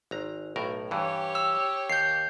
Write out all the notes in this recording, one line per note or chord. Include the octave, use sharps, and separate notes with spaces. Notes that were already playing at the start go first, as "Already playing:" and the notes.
G#1 A#5
B1 A2 A#4
G2 E3 G4 C#5
E6
D#2 G6 C7